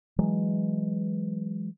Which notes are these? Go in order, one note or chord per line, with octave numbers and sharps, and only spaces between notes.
E3 F#3 G#3